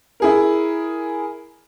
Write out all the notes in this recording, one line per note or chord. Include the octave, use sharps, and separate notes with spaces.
E4 G#4 A#4